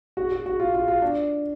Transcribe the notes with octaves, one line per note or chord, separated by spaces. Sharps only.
F#4
F#4
F#4
F4
F4
F4
D4